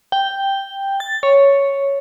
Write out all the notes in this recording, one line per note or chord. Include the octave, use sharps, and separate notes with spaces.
G5
A6
C#5